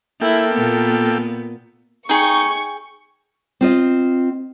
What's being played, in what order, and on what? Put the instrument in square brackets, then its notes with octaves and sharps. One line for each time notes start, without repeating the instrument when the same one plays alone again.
[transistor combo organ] A#3 A4 G5 [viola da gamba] E4
[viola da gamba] A#2 B3
[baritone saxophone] D#4 [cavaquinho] G#4 G5 [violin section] C#6
[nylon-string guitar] C4 F4 D#5